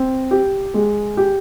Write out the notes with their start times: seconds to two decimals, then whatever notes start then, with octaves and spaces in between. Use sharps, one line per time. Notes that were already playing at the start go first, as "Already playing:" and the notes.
Already playing: C4
0.31 G4
0.74 G#3
1.17 G4